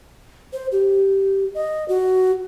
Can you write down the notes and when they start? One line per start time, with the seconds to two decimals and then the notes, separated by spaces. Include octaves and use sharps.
0.53 C5
0.72 G4
1.55 D#5
1.88 F#4